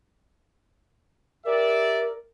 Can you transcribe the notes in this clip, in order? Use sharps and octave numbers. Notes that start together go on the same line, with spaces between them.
G4 A#4 D5 E5